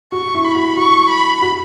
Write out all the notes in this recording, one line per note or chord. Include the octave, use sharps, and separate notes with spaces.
F#4 C#6
E4
B5
F#4
F#4 C#6
B5
F#4